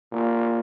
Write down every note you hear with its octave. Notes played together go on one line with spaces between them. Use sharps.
A#2